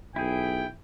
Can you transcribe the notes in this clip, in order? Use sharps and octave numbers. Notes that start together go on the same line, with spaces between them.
B1 E4 G#4 G5